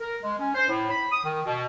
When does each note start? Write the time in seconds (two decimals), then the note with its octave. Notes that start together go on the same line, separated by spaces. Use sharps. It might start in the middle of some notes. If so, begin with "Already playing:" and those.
0.01 A#4
0.23 G#3
0.40 C#4
0.55 C5
0.69 A2
0.90 B5
1.11 D#6
1.25 D#3
1.46 B2